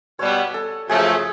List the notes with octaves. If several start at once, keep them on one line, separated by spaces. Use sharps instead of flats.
B2 G3 B3 C#5
A4
F#2 C#3 F3 A3 G#4